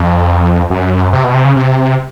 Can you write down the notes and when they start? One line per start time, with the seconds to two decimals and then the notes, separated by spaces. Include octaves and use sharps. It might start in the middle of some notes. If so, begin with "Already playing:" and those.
Already playing: F2
0.70 F#2
1.13 C3
1.24 B2
1.34 C3
1.45 C#3
1.56 C3